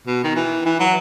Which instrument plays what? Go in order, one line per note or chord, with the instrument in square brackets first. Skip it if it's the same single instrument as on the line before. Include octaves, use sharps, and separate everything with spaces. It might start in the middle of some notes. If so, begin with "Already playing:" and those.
[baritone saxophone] B2
D#3
E3
E3
F#3